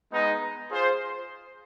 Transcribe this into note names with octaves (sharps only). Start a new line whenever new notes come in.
G#3 B3 D#4
F4 G#4 C5